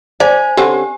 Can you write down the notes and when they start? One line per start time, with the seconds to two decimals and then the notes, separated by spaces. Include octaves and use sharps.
0.20 C5 D5 G#5
0.57 D3 C4 C#4 G4